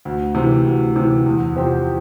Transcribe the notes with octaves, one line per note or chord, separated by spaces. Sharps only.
D2
C3 E3
D2
C3 E3
E2
C3 F3 C4 G4